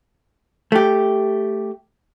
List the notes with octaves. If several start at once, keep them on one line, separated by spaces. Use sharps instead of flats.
A3 G4